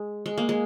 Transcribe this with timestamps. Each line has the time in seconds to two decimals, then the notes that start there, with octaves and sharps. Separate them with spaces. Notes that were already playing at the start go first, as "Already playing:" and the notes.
Already playing: G#3
0.26 G#3
0.38 A#3
0.49 G#3